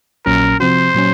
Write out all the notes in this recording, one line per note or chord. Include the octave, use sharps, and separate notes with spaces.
A#1 A#2 F#3 C#4 A#4
C3 F3 C4 F#4 C5
A#2 F#3 C#4